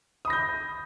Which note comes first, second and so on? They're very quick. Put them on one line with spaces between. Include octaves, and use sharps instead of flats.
D#6 B5 A#6 G6